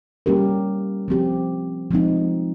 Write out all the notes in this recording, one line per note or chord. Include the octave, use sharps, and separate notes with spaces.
G3 A#3 C#4 G4 A#4
F3 C4 G4
F3 G#3 C4 D#4